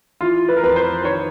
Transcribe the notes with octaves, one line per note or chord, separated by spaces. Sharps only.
E3 F4
B4
A#4
F2 B4
C5
D#3 C#5